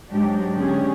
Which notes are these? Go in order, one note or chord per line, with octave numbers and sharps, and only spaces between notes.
G#2 F#3 G#3 D4 G4
D3 B3 C#4 G4 G#4